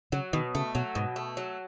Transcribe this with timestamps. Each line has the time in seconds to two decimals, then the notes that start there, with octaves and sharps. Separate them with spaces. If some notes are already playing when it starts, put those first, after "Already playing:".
0.12 C#3 F#3
0.33 B2 D#3
0.55 C#3 A3
0.75 B2 F#3
0.95 G#2 B2
1.16 A3
1.37 F#3